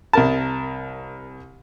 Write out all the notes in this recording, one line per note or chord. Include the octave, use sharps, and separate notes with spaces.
C2 A#4 A5